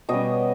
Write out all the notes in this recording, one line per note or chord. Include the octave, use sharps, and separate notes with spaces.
B2 G3 C#4 D#5